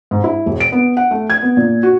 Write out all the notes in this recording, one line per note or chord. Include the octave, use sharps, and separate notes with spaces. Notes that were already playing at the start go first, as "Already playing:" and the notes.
G#2
E4
E1
D7
B3
F#5
A3
G#6
B3
A#2
F#4